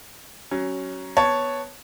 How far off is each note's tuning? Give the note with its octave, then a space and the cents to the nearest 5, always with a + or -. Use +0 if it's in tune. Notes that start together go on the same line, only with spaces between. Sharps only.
F#3 +20 C#4 +0
B3 +0 C#5 +0 A5 +0